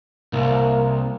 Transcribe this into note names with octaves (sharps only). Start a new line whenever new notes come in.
C2 A#3